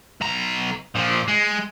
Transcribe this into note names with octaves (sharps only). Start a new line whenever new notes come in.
B1 A#5
A#2 F3
G#3